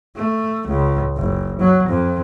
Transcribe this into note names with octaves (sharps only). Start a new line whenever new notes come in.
A3
C#2
F#1
F#3
F2